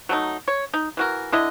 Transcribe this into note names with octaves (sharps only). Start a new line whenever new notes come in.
F#3 A3 D#4
C#5
D#4
E3 F#4 A#4
D3 E4 D#5